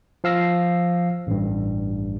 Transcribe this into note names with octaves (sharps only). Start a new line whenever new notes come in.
F3 F5 E6 A#6 C7
A1 G2